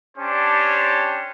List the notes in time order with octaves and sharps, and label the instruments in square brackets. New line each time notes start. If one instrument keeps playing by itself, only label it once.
[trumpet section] C#4 D4 G4 C5 C#5 A5